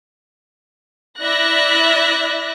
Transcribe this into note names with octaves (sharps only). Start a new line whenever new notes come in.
E4 D5 E5 F#6 A#6